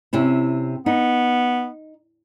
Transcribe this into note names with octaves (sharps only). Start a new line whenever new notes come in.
C3 C#4 E4
B3 D#4